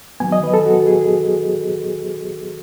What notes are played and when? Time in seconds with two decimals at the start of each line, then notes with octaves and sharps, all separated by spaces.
0.20 D#3 F#3 B3 G#5
0.32 D#5
0.43 B4
0.54 A4
0.66 F#4
0.87 G#4